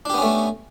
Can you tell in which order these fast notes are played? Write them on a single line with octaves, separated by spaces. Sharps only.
D4 G4 B3 C#4 A3